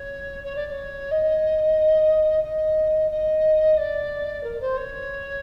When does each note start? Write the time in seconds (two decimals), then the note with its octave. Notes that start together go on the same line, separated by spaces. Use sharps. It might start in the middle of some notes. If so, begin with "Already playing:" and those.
Already playing: C#5
0.44 C#5
0.55 D5
0.67 D5
0.71 C#5
1.11 D#5
2.43 D#5
3.10 D#5
3.77 D5
4.43 A#4
4.60 C5
4.77 C#5